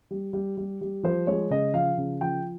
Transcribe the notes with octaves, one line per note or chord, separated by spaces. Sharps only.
G3
G3
G3
G3
F3 C5
G#3 C#5
C#3 D#5
F3 F5
C#3
F3 G5